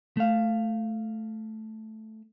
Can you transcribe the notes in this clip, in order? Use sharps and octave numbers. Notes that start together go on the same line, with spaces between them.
A3 F5